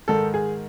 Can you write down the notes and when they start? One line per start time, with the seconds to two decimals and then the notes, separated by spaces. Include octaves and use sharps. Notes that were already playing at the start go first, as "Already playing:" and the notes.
0.08 G#2 D#3 A4
0.34 G#4